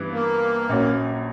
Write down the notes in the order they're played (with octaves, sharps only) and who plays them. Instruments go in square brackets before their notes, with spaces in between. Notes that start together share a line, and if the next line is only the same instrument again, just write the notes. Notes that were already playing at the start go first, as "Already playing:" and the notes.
Already playing: [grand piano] G2 E3 B3
[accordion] A#3
[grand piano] A#1 A#2 F#3 C#4